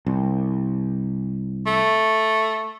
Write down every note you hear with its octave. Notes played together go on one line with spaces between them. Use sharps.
C2
A3